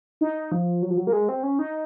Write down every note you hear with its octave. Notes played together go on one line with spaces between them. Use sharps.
D#4
F3
F#3
F3
F#3
A#3
G#3
C4
C#4
D#4